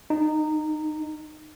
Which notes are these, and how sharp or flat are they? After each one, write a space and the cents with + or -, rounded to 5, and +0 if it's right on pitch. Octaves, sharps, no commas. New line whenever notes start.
D#4 -20